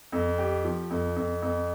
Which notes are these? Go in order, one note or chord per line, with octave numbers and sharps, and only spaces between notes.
F2
G4
F3
F2
F2
F2